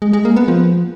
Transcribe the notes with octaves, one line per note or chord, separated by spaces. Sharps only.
G#3
G#3
A#3
B3
F3